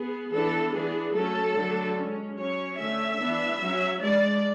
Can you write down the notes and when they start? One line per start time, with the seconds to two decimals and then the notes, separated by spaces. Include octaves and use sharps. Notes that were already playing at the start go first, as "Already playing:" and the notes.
Already playing: B3 G#4
0.33 E3 B3 D4 A4
0.74 E3 B3 D4 G#4
1.15 F#3 A3 C#4 A4
1.56 D3 F#3 A3 D4
1.97 G#3 C#4
2.38 F#3 C#4 C#5
2.79 D3 A3 C#4 E5
3.20 E3 B3 D4
3.60 F#3 C#4
4.01 G#3 D4 D5